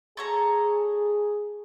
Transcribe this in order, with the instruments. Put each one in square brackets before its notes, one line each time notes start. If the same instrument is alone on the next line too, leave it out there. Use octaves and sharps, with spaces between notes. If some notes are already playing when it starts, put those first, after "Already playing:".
[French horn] G#4 [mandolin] A4 C#5 A#5